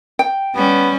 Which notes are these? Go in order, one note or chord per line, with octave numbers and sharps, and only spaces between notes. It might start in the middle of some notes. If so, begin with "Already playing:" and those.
G5
G3 B3 C#4